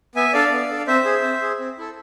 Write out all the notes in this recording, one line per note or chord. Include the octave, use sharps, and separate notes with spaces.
B3 E5 G#5
D4 A4 D5 F5
B3
D4 A4
C4 C5 E5
G#4
C4
G#4
C4
E4 A4